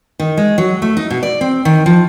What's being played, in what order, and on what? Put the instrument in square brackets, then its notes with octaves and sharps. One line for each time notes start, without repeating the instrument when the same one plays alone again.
[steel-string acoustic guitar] D#3
G#3
F#3
A3
D#4
B2
D5
C4
D#3
F3